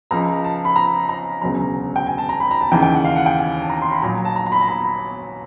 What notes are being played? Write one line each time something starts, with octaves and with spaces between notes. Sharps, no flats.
C#2 C#3 F3 A#5
A5
B5
A#5
A#5
E1 D2 C#3 F#3 A#5
G5
G#5
A5
A#5
B5
A#5
A5
D#2 C#3 E3 G5
G5
F#5
F5
F#5
G5
G#5
A5
A#5
C6
B5
A#1 A#2 F#3 A#5
A5
A#5
A#5
B5
A#5
B5